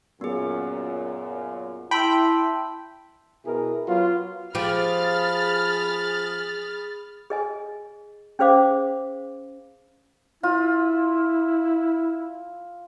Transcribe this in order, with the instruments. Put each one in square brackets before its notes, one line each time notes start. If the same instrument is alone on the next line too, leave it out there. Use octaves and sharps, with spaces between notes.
[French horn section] F#2 A#2 [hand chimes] B3 G#4
[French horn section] E4 [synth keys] G5 B5 [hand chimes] A5 C6 E6
[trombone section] B2 E4 G#4 A#4
F#3 B3 F4
[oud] F3 G4 [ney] G#4 [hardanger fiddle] B5 [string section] F6 A6
[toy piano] G#4 D#5 G#5
C#4 G#4 C5 F5 D6
[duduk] E4 [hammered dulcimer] F4